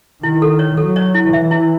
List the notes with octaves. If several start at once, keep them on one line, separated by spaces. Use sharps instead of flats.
D#3 E4
A4
C#5
F#3 A4
C#5
E4
E3 E5
E4